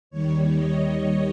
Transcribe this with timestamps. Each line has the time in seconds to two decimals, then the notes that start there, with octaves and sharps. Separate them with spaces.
0.10 D#2 D#3 G3 C#5
0.56 D#5
1.01 C#5